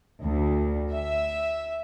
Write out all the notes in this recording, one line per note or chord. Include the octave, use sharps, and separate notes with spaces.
D2
E5